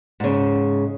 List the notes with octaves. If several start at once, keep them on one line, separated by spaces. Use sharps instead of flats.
G#2 C#3